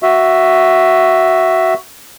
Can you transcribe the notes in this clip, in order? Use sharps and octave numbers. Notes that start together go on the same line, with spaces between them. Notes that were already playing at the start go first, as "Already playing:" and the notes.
F#4 E5